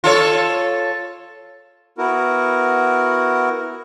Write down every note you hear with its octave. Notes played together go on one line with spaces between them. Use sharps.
F4 A4 C#5
B3 E4 F#4 A#4